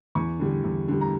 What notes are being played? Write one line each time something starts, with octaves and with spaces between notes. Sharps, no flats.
E2 C#6
D3 G3
E2
D3 G3
A#5